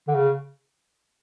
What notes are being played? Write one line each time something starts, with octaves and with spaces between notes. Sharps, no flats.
D3
C#3